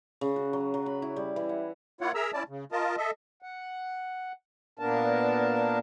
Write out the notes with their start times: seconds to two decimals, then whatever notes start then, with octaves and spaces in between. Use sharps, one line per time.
0.21 C#3
0.36 F#4
0.53 F#3
0.74 F#3
0.86 B5
1.02 E4
1.16 G3
1.36 E3
1.49 F#5
2.01 A#3 E4 F4 C#5 F#5
2.15 G#4 A#4 E5 A#5 E6
2.33 C#4 E4 D5 A5
2.49 C#3
2.72 F4 A#4 D#5 A5
2.97 A4 D#5 E5
3.42 F#5
4.79 A#2 A#3 B3 D4 A#4 A5